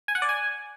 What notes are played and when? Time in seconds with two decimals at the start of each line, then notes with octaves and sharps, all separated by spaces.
0.08 G#5
0.15 F#5
0.22 D5
0.29 G#5